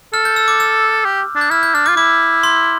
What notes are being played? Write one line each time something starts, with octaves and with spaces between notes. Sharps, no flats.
A4 F6
G6
E6
D6
E6
G4
D4
G6
E4 F6
G6
D4 F6
D6
F4
E4 D6
C6